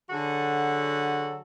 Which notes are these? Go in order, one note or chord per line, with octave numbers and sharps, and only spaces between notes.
D3 F#3 F#4 G#4 A4